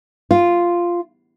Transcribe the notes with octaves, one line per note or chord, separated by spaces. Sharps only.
F4